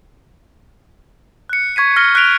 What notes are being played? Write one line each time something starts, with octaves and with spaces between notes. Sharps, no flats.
F#6 C#7
C#6 G#6 B6 D#7
F6 A#6 C#7 G7
F#6 B6 D7 F7 G7